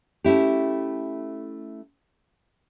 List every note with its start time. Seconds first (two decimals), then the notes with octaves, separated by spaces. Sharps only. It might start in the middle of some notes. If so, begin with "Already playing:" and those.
0.24 A3 C#4 E4 G4